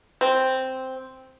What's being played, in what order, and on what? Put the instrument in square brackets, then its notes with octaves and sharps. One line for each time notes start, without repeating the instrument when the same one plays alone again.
[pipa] C4